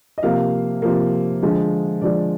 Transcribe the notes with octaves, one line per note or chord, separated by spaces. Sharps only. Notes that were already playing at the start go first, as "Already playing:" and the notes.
D#5
C3 F3 A#3 F5
C3 F3 A#3
D3 F3 G#3
D3 F3 G#3 D5